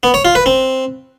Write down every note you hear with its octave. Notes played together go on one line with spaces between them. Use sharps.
B3
C#5
F4
B4
C4